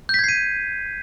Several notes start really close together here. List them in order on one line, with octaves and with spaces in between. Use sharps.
G6 B6 G#6 C7 D#7